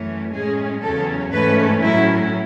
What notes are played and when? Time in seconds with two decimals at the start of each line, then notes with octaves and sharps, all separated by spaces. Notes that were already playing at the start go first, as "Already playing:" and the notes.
Already playing: F#2 E3 A3 C#4
0.33 A2 G#3 C#4 G#4
0.82 E2 C#3 F#3 C#4 A4
1.31 G#2 E3 A3 C#4 B4
1.81 A2 F#3 C#4 E4